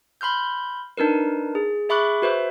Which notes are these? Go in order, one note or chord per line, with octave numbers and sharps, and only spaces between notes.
B5 C6 F6 G6
D4 D#4 A#4 B4
G#4
G#4 E5 B5 C#6 D6 F#6
F#4 B4 C5 E5